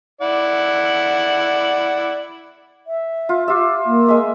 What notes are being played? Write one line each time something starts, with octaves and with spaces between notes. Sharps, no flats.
E4 D5 F#5
E5
F4
F4 G4 E5
A#3
G#3 E5